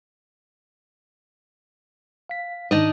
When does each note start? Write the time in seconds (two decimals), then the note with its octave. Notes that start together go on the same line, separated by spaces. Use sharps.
2.29 F5 B6
2.71 G#2 D#3 D4 D#4 D#5